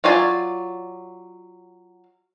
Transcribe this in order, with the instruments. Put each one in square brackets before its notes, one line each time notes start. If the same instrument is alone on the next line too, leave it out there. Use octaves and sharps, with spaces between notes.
[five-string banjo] F#3 F4 D5 G#5